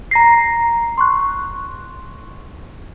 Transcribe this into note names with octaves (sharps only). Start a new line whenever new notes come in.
A#5 A#6 C7
C6 C#6 F#6